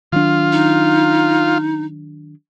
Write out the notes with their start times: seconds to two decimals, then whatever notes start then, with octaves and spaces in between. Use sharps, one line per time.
0.12 D#3 F#3 D4 F4
0.52 D#4